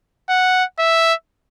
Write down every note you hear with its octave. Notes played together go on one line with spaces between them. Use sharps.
F#5
E5